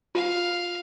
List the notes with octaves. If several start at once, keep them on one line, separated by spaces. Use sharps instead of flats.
F4 F5